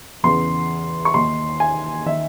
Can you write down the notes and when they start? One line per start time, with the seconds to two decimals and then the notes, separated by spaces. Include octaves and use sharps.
0.23 E2 C#3 E3 C6
1.05 C#6
1.14 D#2 D#3 C6
1.60 G#5
2.06 D#3 E5